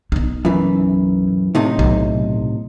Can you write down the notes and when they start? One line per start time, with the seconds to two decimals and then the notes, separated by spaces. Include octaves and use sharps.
0.12 B1 D#4
0.45 F#2 E3
1.55 A2 C3 D#4
1.79 B1